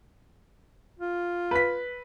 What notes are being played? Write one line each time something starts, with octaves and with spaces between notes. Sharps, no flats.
F4
B4 B6